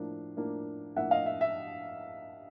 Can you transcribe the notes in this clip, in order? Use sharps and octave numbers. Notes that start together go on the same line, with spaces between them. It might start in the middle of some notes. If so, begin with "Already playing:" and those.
Already playing: A2 F3 A#3 D4
A2 F3 A#3 D4
A2 F3 A#3 D4 E5 F#5
D#5 F5
E5
E5